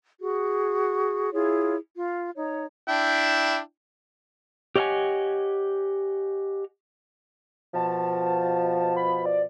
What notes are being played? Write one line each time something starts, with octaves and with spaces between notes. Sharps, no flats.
F#4 G#4
E4 F4 G#4 C#5
F4
D#4 C#5
D4 E4 G5
G4 C#5 D#5 E5 F#5 G#5
B2 F3 A5
B5
D5